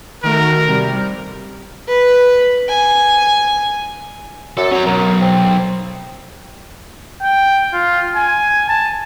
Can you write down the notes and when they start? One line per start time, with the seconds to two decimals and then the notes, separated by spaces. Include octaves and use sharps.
0.23 D#3 A3 F#4 A#4
0.67 C3 G3
1.88 B4
2.69 G#5
4.57 F#2 A4
4.72 F#3 C#4 A#5
4.86 B1 A#4
5.21 C4
7.22 G5
7.73 F4
8.15 G#5
8.69 A5